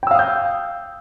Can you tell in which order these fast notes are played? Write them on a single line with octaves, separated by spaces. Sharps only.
G5 E6 F5 D#6 G6